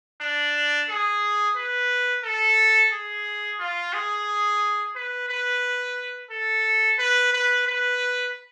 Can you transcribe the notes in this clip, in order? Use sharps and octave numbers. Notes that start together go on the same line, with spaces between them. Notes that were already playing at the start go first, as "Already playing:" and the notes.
D4
G#4
B4
A4
G#4
F4
G#4
B4
B4
A4
B4
B4
B4